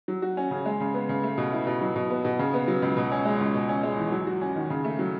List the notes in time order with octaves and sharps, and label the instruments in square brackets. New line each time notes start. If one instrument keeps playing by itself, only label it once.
[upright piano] F#3
F#4
C#4
C#3
G#3
C#3
B3
C#3
A3
B2
E4
B2
F#3
B2
B3
B2
C#3
B3
F#3
C#2
B2
C#4
G#3
C#2
B2
C#4
G#3
E2
F#3
F#4
C#4
D#3
C#3
A3
F#3